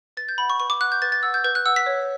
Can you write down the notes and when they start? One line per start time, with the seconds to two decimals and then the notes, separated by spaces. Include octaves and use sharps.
0.17 B4 A6
0.29 G6
0.38 F#5 B5
0.50 C#6
0.60 B4 C#6
0.70 D6
0.81 F#5 F#6
0.92 G6
1.02 B4 A6
1.12 A6
1.23 F#5 E6
1.34 G6
1.44 B4 G6
1.55 F#6
1.66 F#5 E6
1.76 B6
1.86 C#5